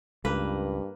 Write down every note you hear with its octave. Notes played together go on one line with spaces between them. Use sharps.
C#2 G2 A#3 B4